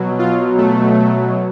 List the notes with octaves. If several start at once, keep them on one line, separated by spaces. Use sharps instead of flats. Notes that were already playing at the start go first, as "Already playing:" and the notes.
Already playing: B2 F#3
F4
A3